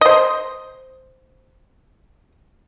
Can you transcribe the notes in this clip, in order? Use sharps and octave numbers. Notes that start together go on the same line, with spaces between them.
C5 D#5